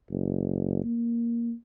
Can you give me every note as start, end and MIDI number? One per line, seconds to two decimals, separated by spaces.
0.11 0.83 30
0.84 1.54 58